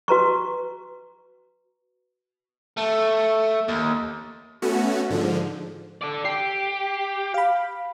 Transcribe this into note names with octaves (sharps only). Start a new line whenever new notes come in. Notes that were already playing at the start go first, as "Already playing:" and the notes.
F#4 B4 A#5 C#6
A3
D#2
A3 B3 C#4 F#4
G#2 D3 F3
A4 D5
G4 C7
F5 B5